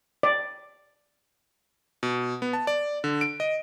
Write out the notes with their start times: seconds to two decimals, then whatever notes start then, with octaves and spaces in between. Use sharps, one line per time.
0.23 D5
2.03 B2
2.42 B3
2.53 A5
2.67 D5
3.04 D3
3.21 D7
3.40 D#5